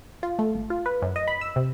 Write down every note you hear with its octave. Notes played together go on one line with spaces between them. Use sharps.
F4
A3
G#1
F4
B4
F#2
D#5
B5
E6
C3